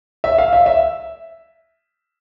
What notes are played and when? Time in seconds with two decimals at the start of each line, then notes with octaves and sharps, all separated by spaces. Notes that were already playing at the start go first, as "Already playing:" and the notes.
0.24 E5
0.38 F5
0.53 E5
0.66 E5